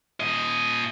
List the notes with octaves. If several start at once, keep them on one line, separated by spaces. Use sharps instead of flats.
A#2 D#5